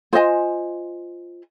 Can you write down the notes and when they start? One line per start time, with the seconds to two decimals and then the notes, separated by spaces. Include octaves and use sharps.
0.13 F4 C5 D#5 G#5